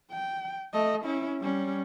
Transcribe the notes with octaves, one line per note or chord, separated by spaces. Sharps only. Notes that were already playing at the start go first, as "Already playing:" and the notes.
G5
A3 D#5
C#4 E4
G3 C#4